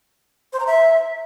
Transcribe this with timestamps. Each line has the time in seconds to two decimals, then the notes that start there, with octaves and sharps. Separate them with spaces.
0.53 C5
0.60 A#5
0.67 E5